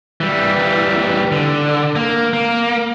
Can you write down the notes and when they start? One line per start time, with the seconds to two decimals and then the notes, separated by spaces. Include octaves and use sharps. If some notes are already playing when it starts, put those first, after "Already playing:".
0.20 E3 G3
1.32 D3
1.95 A#3
2.33 A#3